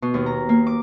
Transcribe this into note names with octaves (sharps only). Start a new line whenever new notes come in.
B2
D#2
A#5
A#3
D6